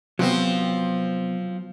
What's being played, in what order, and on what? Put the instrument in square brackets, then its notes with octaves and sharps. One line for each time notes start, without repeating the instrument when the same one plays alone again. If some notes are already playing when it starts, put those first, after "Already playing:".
[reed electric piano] C3 B3 [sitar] F3 C4 [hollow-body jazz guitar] F#3